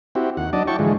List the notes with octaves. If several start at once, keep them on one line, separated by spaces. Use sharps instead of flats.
C4 E4 F#4 G4
D#2 F#5
F#3 D4 D5 D#5 A5
E4 F#4 C#5 G5 A5 C#6
G#2 D3 E3 F3 G#3